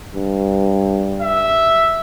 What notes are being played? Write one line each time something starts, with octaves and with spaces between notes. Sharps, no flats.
G2
E5